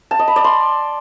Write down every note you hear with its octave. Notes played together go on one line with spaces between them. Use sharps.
A5
D#5
B5
D5
C6